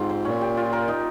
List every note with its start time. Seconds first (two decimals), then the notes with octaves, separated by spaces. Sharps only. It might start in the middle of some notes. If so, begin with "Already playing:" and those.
Already playing: G#2 C4 F4 G4
0.09 C5
0.25 A#2 C#4
0.41 G4
0.57 F4
0.73 A#4
0.88 D#4